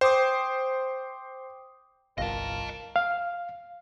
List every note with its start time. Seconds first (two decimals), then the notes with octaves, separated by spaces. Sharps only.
0.01 C5 G5 D6 D#6
2.18 G1 C2 F4 A#4 D#5 F5 A5
2.96 F5